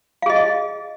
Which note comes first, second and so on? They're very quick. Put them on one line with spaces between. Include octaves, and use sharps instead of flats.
F5 G#4 D#5